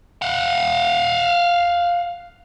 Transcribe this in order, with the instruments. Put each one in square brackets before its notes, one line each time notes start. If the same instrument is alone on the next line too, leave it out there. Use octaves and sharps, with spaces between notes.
[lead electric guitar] F5 F#5